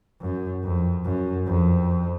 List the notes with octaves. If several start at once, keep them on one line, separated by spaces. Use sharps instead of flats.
F#2
F2
F#2
F2